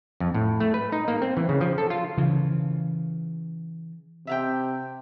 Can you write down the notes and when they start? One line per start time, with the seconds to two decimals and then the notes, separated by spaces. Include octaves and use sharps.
0.20 F2
0.34 A2
0.60 A3
0.74 B4
0.92 D#4
1.08 A#3
1.22 C4
1.37 E3
1.49 C#3
1.61 F3
1.78 A4
1.90 F4
2.18 C#3 E3
4.27 C3 E5 F5 G5